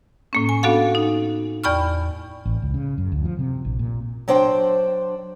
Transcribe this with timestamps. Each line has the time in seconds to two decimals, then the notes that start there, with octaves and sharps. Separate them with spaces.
0.33 A2 A#3 C#4
0.49 G#5
0.63 B3 D4 F#4 A4 F5 F#5
0.95 D#4
1.64 E2 D5 G5 B5 C#6 F6
2.45 A1
2.62 C#2
2.74 C#3
2.98 F#2
3.12 D2
3.25 F3
3.39 C3
3.65 A#1
3.79 A#2
4.28 F#3 D4 C5 G5